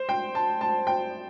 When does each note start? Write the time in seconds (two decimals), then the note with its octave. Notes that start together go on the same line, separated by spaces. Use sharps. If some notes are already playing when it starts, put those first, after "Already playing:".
Already playing: C5
0.09 G5
0.35 A5
0.61 A5
0.87 G5